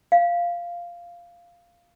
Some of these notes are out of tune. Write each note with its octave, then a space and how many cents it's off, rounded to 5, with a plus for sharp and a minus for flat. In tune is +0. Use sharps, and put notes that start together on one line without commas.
F5 -5